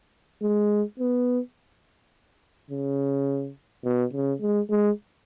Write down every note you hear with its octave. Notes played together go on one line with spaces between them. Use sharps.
G#3
B3
C#3
B2
C#3
G#3
G#3